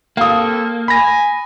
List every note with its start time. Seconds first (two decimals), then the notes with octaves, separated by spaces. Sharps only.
0.17 G3 A#3 C4 A4 F5 D#6
0.88 G#5 B5 A#6